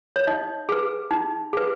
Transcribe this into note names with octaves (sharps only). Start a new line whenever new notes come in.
C#5
D#4 D#5
G#4 B4
D#4
G#4 B4